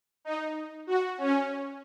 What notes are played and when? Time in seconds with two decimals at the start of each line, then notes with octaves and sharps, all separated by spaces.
0.25 D#4
0.87 F#4
1.18 C#4